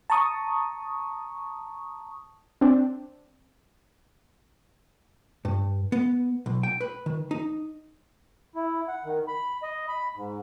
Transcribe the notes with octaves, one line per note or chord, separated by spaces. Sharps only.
A5 A#5 C#6 D#6
C4 D4
G2
B3
B1
G5
B4
D#3
D#4
E4
F#5
D#3
B5
D#5
B5
G#2